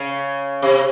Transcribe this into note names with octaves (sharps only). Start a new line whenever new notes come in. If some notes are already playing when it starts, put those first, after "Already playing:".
Already playing: C#3
C3